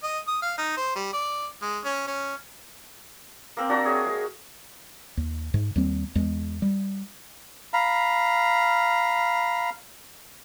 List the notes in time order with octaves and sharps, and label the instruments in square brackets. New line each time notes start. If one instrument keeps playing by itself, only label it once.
[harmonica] D#5
D#6
F5
D#4
C5
G3
D5
G#3
C#4
C#4
[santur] A#3 C4
D4 F#4 G4 A#5
G#4 C#5 E5
G#3
[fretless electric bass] D#2
G#2
D#2 G3 C4
E2 G#3
G3
[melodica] F5 A#5 B5